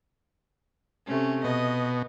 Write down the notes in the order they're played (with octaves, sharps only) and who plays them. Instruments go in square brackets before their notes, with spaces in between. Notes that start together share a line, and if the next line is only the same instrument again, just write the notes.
[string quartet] C3 A3 C#4
[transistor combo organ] B2 [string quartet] D#5